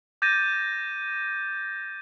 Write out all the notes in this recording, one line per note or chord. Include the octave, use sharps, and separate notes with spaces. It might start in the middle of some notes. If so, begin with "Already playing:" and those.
D6 G6 A6 A#6 D#7